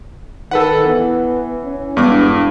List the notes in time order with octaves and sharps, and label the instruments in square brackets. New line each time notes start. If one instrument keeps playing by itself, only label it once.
[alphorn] D#3 [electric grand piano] A4 B4 F#5
[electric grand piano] E3 [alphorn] B3
[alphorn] C#4
[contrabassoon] E1 [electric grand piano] G2 D6 [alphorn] B3